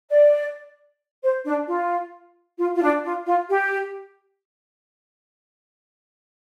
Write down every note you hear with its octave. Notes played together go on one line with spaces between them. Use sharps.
D5
C5
D4
F4
F4
F4
D4
F4
F4
G4